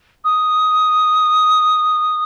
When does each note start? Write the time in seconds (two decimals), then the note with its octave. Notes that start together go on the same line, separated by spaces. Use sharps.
0.24 D#6